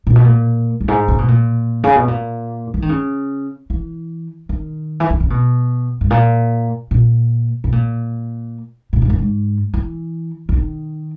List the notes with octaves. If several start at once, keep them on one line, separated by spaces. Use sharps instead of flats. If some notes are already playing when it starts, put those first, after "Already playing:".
A#2
B2
A#2
F#2
G#2
C#3
B2
A#2
C#3
B2
A#2
E3
D#3
C#3
E3
D#3
E3
D#3
C#3
B2
G#2
A#2
A#2
B2
A#2
A#2
G#2
F#2
G#2
E3
C#3
D#3